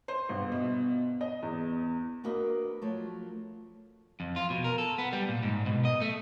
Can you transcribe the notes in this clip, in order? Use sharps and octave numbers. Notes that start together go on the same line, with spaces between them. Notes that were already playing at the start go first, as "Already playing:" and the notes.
C5
G1
B2
D#5
E2
A#3 D4 F#4 A#4 B4 D#5
F3 F#3 A3
F2
F4
B2
A#4
A4
B3
G3
A#2
G#2
B2
D#5
A3